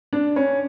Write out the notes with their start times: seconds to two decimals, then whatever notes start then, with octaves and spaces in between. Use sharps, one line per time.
0.13 D4
0.36 C#4